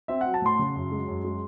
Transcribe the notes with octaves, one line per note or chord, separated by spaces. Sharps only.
C4 E5
F#3 F#5
A5
A2 C6
C#3
F#2
G#3
F#2
G#3